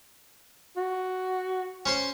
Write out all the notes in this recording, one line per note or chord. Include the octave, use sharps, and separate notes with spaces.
F#4
C#4 C5 C6